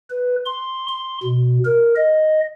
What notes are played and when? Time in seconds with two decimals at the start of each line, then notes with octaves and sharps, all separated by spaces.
0.10 B4
0.46 C6
0.88 C6
1.23 B2
1.65 A#4
1.96 D#5